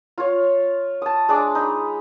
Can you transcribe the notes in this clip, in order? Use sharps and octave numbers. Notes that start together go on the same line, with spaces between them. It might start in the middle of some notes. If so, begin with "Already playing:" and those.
F4 C#5
A5 D#6
G#3 D4 D6
D#4 B5